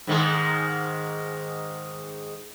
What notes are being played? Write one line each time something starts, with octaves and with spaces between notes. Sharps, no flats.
G#2 D#3 G#3